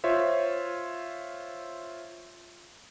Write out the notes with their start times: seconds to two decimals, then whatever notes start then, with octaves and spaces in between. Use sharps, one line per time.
0.04 F4 C5 C#5 E5